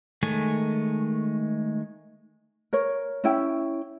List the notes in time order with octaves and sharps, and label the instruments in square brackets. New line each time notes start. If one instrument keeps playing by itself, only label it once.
[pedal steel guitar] D#3 G#3 A3 C#5 G#5
[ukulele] A#4 C#5
C#4 E4 G5